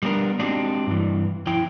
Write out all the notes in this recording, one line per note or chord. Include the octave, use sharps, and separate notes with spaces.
G3 B3 D4 A#4
G#3 C4 D4 D#4 F#4 G4
G2 E3
F2 F3 E4 G5